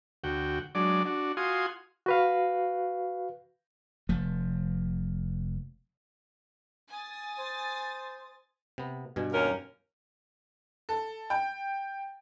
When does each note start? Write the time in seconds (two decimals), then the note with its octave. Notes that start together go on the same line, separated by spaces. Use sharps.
0.24 D2 F#4 G5
0.75 F#3 G#3 D4 D5
1.05 D4 F#4
1.37 F4 F#4 G#5 C6 D#6
2.06 F#4 B4 F5
4.09 F1 F3 A3
6.89 G#5 D#6 A6
7.39 C5
8.78 C3 B3
9.16 G2 B2 G#5
9.33 D#2 C#4 A#4
10.89 A4
11.30 G5